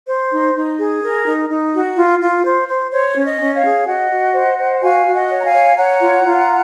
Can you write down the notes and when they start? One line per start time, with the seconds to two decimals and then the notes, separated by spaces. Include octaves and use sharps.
0.07 C5
0.31 D#4
0.54 D#4
0.78 G#4
1.02 A#4
1.26 D#4
1.49 D#4
1.73 F#4
1.97 F4
2.21 F4
2.45 C5
2.68 C5
2.92 C5 C#5
3.16 C#4
3.23 D#5
3.40 C#4
3.55 C#5 F5
3.63 G#4
3.87 F#4 D#5 F#5
4.11 F#4
4.34 C5
4.58 C5
4.82 F#4 F5 G#5
5.06 F#4
5.14 D#5 F#5
5.30 C#5
5.40 A#5
5.45 F5 G#5
5.53 C#5
5.77 C#5 F#5 A#5
6.01 F4
6.24 F4